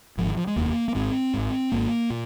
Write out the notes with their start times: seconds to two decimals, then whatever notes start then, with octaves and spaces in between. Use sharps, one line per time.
0.18 G#1 G#2 F3
0.27 D#3
0.37 F3
0.47 G#3
0.56 F1 D#2 A#3
0.88 A#3
0.95 G#1 G#2 C4
1.34 G#1 G#2
1.72 G#1 G#2 A#3
2.10 A#2